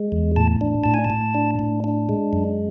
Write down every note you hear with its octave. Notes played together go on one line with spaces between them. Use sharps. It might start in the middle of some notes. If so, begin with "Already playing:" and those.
Already playing: G#3
E2
A2 A5
D4
A2 A5
G#5
A5
A2
D4
A2
D4
G#3
F#2